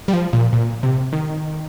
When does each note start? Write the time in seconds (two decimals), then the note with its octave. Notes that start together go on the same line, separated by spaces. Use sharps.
0.08 G3
0.13 F3
0.33 A#2
0.53 A#2
0.83 C3
1.13 D#3